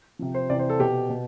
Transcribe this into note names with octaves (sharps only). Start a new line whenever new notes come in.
C3 F3
C5
C3 E3 D5
C5
A4
B2 G4
B2